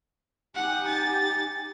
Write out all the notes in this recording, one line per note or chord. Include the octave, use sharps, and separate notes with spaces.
D#4 G4 F#5 G#5
A6